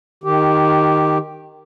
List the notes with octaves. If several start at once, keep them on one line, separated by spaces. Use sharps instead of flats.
D#3 G4